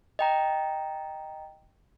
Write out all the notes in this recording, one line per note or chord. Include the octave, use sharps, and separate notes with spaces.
D#5 G5 A#5